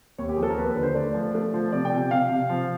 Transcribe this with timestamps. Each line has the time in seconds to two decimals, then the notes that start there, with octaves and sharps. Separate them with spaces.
0.18 D#2 C#5
0.29 G4
0.36 F3 G#4
0.43 A4
0.50 A#4
0.58 D#2 B4
0.70 B4
0.76 D3
0.83 C5
0.95 A3 D5
1.14 F3
1.35 A3
1.54 F3
1.72 C3 D5
1.85 G5
1.92 C3
1.97 G5
2.11 C3 F5
2.30 C3
2.49 F3